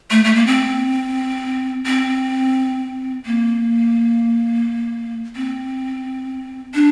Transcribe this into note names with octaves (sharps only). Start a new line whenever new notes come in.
A3
A3
A#3
C4
C4
A#3
C4
D4